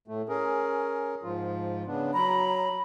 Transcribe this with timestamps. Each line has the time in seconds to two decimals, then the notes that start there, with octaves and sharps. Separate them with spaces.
0.08 A2 A3
0.29 C#4 G#4 A#4
1.23 G#2 F3 F4
1.86 C#3 B3 D4
2.14 F#3 A#5 B5